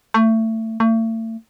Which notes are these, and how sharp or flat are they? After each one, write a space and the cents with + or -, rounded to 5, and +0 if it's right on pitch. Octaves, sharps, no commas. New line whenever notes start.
A3 +25
A3 +40